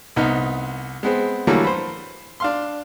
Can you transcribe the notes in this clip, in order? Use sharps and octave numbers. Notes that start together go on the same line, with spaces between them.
C2 B3 D#4
G#3 B3 C4
D3 E3 F#3 G3 A3 A#3
B4 C5
D4 F5 C6